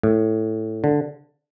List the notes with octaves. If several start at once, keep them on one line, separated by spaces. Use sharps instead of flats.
A2
D3